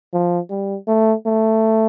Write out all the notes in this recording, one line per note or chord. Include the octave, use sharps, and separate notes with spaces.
F3
G3
A3
A3